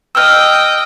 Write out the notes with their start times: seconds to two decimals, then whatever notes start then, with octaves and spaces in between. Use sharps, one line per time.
0.15 D#5 G5 E6 F6